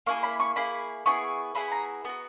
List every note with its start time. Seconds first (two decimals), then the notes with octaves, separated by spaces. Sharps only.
0.06 A#3 E4 G#4 C#6
0.23 B5
0.40 C#6
0.56 A#3 E4 G#4 B5
1.06 B3 E4 G#4 C#6
1.55 B3 E4 G#4 B5
1.72 A#5
2.05 B3 F#4